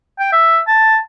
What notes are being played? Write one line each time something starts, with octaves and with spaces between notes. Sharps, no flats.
G5
E5
A5